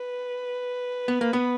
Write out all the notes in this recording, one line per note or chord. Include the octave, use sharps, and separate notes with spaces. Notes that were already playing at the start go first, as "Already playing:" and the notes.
Already playing: B4
B3
A#3
B3